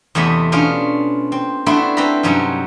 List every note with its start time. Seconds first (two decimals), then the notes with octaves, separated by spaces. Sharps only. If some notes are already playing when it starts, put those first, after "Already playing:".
0.15 E2 C3 A3 D#5 B5
0.52 B2 C#4 D4 F4 F5
1.32 C4
1.66 A3 B3 D4 E4 F#4 C6
1.97 C4 A4 B4 E5 A#5 B5
2.23 G2 C3 F#3 C#4 D#4